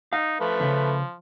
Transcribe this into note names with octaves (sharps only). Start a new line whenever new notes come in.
D#4 F5
F3 A3 B4
D#2 C#3